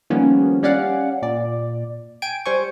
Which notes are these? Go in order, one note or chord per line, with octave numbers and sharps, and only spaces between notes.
D#3 F3 G3 A#3 B3 C#4
G3 C#4 D5 F5 F#5
A#2 D5
G5 G#5 G#6 D7
G3 C5 G#5 C#6